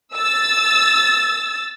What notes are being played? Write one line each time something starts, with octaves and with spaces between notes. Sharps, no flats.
E6 A6